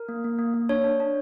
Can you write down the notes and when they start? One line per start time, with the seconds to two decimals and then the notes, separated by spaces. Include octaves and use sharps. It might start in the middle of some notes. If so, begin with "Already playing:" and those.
Already playing: A#4
0.09 A#3
0.24 A#3
0.39 A#3
0.54 A#3
0.69 D4 C#5
0.84 D4
1.00 D4